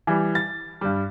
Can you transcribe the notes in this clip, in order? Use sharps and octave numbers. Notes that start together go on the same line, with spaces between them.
E3 G3
A6
G2 G3